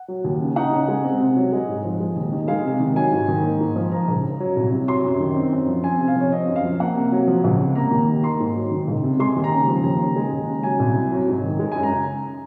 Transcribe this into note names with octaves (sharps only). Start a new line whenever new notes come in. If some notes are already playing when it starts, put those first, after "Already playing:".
Already playing: F#5
F#3
D#2
C#3
D#4 F#5
C#3
G#3
C4
C3
F#3
G#3 D#5
G#2
F3
G#3
D#2
D#3
G#3 F5
C3
D#3
F#3 G#5
G#2
D#3
A#3
G#2
F3
F3 A#5
C#2
C#3
F#3
C2
C3
F#3 C6
F#2
D#3
C4
F#2
F3
C4 G#5
C3
F5
F3 C#5
C4 D#5
F#2
F5
F3
A#3 F#5
C3
F#3
F3
C#2
C3
A#3 A#5
D#2
D#3
A#3 C6
G#2
F#3
D#3
C#2
C3
G#3 C6
D#2
A#5
C#3
F3
D#2
C#3
G#3
D#2
C#3
F#3 G#5
C2
C3
F#3
G#2
D#3
G#3
F#2 G#5
A#5
C#3